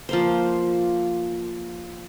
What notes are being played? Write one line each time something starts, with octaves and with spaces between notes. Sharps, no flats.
F3 A#3 C5